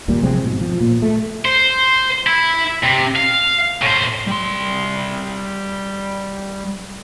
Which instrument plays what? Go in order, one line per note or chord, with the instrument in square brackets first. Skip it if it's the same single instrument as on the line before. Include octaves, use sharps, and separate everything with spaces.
[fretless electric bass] D#1 G#1 A#2 G3
C3 F3 G#3 C4
G#2 B2
F3
A#2
A3
[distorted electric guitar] C5
E4
C3
F5
A2 C5
[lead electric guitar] G3 C6